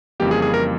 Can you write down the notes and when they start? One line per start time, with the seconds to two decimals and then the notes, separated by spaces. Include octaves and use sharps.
0.20 F2 C#3 E3 G3 A#3 G4
0.31 G#4
0.42 G#4
0.54 A#4